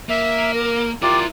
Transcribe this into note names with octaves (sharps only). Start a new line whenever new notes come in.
A#3 E5
A#4
E4 F4 G4 A#4 D5